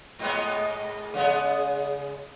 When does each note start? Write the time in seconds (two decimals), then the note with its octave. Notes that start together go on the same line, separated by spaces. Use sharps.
0.19 G#2 G#3 B3
1.13 C#3 G#3 B3